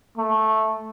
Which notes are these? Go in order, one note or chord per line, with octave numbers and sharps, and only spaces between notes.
A3